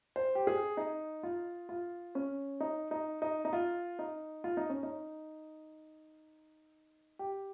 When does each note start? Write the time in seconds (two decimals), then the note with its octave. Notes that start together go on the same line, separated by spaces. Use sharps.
0.16 C5
0.35 G4
0.47 G#4
0.77 D#4
1.23 F4
1.69 F4
2.15 C#4
2.60 D#4
2.91 D#4
3.22 D#4
3.45 D#4
3.53 F4
3.99 D#4
4.44 F4
4.57 D#4
4.70 C#4
4.83 D#4
7.19 G4